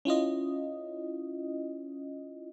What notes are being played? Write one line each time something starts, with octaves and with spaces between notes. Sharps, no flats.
C#4 E4 F4 D#5